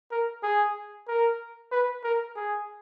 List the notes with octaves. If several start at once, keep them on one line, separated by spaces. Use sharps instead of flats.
A#4
G#4
A#4
B4
A#4
G#4